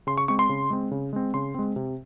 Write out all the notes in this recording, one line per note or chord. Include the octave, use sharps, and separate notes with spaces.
C#3 C6
C#6
G#3 C4 C#6
C6
C#3
G#3 C4
C#3
G#3 C4
C#3 C6
G#3 C4
C3